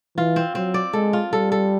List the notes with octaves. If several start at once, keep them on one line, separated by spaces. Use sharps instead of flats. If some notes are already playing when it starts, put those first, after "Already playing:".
E3 F4
C4
F#3 C4
D5
G#3 A4
F4
G3 A4
A4